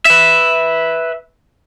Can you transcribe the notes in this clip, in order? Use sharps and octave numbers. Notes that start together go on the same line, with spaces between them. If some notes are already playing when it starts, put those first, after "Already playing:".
B4 E5